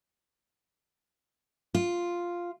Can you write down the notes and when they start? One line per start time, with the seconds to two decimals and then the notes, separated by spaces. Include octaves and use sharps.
1.75 F4